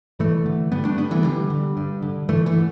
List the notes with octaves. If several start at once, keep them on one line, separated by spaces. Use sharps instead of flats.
G2 E3 A3
D3
G2 G3 B3
A3 D4
D3 G3 B3
E3 A3
G2 D3 G3
D3
G2
D3
G2 E3 A3
E3 A3
D3